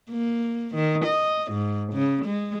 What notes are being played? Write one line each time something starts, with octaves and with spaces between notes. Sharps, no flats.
A#3
D#3
D#5
G#2
C#3
G#3